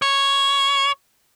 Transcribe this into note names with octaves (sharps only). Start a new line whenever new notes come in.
C#5